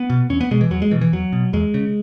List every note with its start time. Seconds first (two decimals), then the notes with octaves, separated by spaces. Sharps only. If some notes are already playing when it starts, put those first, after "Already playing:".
Already playing: B3
0.10 B2
0.29 E2 C#4
0.41 B3
0.51 B2 G#3
0.61 E3
0.70 E2 F#3
0.82 G#3
0.91 B2 E3
1.01 E3
1.12 E2 F#3
1.33 B2
1.53 E2 G#3
1.74 C#3